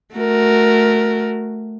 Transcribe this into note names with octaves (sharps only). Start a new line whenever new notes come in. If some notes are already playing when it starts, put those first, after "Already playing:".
A3 F#4 A#4